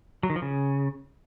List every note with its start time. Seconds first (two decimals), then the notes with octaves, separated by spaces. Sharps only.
0.23 F#3
0.30 D#3
0.36 F3
0.42 C#3